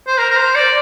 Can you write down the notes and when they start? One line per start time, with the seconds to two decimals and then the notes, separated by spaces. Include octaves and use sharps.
0.07 C5
0.18 A#4
0.30 A#4
0.37 C5
0.55 D5